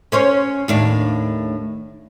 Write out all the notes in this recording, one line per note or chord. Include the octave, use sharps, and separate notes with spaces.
C#4 C5 C#5
D#2 A2 D4